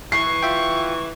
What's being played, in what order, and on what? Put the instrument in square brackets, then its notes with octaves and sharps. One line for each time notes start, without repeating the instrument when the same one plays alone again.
[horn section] E3 [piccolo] C#6 [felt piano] C7
[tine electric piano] F4 E5 G5